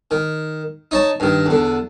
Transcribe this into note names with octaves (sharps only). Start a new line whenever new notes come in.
D#3
D#4 C#5 A5
G2 D#3
E2 D3